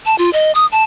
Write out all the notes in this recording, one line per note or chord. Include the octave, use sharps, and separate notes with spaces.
A5
F4
D#5
D#6
A5